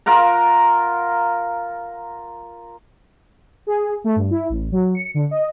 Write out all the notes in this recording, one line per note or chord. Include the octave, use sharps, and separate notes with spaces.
F4 A#4 F#5 A#5
G#4
A3
G2
E4
A1
F#3
C#7
D3
D#5